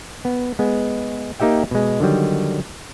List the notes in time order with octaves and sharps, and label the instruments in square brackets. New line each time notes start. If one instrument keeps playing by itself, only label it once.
[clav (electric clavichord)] B3
G#3 B3
A#3 D#4 G4 E5 G5
B2 G#3
D3 D#3 F#3 G3